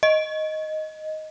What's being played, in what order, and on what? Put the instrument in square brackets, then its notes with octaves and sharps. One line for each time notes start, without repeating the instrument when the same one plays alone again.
[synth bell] D#5